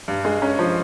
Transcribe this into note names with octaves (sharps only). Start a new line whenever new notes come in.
G2
G#3
C#4
F3